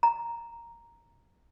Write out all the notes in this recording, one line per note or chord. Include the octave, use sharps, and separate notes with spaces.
A#5